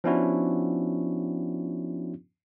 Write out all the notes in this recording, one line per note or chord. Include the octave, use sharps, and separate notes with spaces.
F3 B3 C#4 D4 E4 F#4